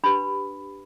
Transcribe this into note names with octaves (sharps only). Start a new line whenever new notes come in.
D4 G4 B4 B5